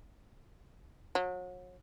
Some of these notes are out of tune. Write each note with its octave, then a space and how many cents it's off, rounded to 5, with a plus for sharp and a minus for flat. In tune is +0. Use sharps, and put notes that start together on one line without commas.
F#3 -35